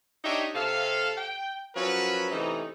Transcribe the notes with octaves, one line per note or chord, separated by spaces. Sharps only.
D4 D#4 G4 C#5 D#5 E5
C3 A4 F5
G5
F3 F#3 C#4 F#4 A#4 B4
C3 E3 A3 C#4 D#4